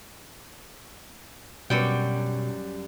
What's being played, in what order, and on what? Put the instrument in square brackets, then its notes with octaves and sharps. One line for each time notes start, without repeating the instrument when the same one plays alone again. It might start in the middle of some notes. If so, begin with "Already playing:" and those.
[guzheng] F#2 G3 G5 [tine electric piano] B2 C#7